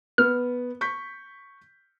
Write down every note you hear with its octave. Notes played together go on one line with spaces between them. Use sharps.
B3 F6
C#6 G6 B6